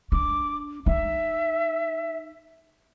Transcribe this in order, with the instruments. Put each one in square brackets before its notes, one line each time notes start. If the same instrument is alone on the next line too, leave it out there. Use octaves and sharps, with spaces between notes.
[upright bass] D4 [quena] D6
[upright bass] D#4 [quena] E5